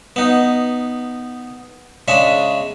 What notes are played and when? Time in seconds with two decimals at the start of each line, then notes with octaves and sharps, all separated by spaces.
0.16 B3 D#4
2.08 C#3 G#3 D4 E5